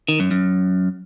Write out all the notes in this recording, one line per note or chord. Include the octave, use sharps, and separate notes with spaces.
D#3
F#2
F#2